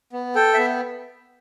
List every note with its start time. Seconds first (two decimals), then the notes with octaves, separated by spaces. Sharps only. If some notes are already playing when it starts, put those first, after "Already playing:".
0.13 B3
0.35 A4 G5
0.54 B3 E5